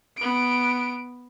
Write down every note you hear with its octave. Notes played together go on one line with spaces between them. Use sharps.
B3 D7